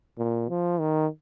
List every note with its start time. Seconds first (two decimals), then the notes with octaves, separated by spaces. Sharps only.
0.18 A#2
0.49 F3
0.80 D#3